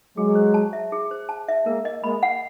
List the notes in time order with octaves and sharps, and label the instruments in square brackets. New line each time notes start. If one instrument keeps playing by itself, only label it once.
[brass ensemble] F#3 G#3 [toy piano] G#4
[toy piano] C5
A5
E5
G#4
C5
A5
E5
[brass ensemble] G#3 A#3 [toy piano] A#4
[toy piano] D#5
[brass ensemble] G#3 A#3 [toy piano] B5
[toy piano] F#5